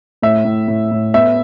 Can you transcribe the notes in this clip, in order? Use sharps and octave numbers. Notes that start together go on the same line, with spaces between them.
A2 E5
A2
A2
A2
B3 E5